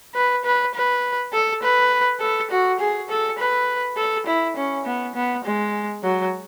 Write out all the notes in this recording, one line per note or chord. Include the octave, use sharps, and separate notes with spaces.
B4
B4
B4
A4
B4
A4
F#4
G#4
A4
B4
A4
E4
C#4
B3
B3
G#3
F#3